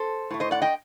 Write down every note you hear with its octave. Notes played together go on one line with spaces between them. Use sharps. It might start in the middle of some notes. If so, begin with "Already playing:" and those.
Already playing: A4 C5
A2 A3
C5 D#5
D5 F#5
D#5 G5